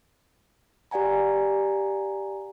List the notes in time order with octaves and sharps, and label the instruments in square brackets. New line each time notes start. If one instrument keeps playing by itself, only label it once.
[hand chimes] G4 D5 F#5 G#5 A#5